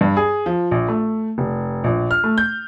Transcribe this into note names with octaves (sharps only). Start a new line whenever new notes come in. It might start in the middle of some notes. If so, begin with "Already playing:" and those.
G2
G#4
F3
A#1
A3
F1
A#1
F6
A3
G6